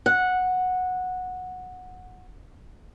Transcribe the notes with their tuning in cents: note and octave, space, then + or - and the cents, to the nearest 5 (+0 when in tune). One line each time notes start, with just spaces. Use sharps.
F#5 -10